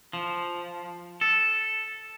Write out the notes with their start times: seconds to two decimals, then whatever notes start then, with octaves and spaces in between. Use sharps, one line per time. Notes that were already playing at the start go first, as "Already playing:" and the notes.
0.13 F3
1.21 A4